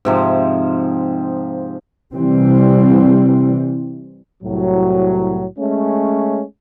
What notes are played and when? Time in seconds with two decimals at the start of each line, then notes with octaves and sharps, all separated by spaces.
0.05 G#2 C3 F3
2.14 C3 E3 G3 C4
4.43 C2 A2 F#3
5.58 G#3 A3 C#4